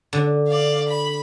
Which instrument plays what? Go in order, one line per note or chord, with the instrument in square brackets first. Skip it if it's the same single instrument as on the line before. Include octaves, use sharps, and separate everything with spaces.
[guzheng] D3
[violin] D5 F5
B5